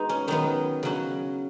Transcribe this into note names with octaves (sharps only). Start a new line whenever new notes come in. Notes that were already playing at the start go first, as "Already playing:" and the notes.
Already playing: G#3 B3 D#4 F#4
C#4
D#3 F#3 B3 D#4
C#3 F#3 C#4